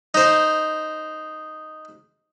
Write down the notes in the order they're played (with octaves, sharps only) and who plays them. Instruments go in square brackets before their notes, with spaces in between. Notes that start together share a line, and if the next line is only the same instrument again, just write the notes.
[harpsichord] D#4 C5